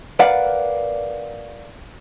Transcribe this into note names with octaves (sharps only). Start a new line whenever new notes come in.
A#4 B4 D5 F5 F#5